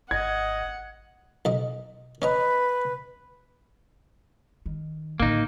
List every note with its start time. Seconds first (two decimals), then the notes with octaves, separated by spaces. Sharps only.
0.11 G#1 D#5 F#5 G#6
1.45 B1 D#5
2.22 C#4 B4 D#5 A#5
4.66 D#3
5.20 A2 D3 A#3 D#4